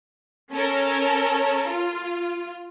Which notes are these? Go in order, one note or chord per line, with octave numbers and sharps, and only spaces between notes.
C#4 A4 A#4
F4